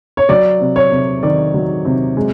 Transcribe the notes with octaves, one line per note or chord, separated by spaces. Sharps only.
C#5
F#3 D5
C3
C#5
C3
D#3 D5
F#3
C3
G#3